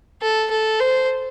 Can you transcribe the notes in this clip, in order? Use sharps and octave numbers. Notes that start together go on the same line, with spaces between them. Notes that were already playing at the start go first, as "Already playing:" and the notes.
A4
A4
C5